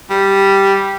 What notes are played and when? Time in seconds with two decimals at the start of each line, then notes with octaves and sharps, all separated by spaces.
0.10 G3